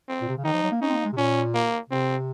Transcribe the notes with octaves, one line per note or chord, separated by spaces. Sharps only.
C4
A#2
C3
C#3
D#3 D#4
F3
F#3
A#3
C#4 D#4
C4
A#3
G#3
C3
A#2 C#4
A#3
C3 C4